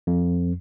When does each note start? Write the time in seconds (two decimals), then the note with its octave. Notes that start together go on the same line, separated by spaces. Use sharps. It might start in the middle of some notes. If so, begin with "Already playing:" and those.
0.07 F2